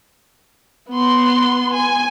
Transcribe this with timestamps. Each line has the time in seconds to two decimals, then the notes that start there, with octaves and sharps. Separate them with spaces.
0.90 B3 C6
1.74 G#5